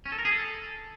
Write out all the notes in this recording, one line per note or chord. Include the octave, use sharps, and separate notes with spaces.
C#4
A4
A#4
G#4
A4